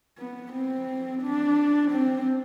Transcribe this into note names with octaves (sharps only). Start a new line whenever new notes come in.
B3
C4
D4
C4